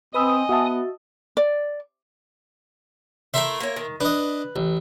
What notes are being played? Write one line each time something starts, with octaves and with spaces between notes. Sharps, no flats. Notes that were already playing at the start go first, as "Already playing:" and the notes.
C4 B4 D#5 G#5 B5 D#6 E6
B3 F#4 E5 A5
D5
A3 E4 A#4 E5 C6
A#3 C#5
D#3
D4 B4 D#5
A1